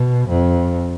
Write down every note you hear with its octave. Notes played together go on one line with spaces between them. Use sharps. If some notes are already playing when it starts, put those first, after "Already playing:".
Already playing: B2
F2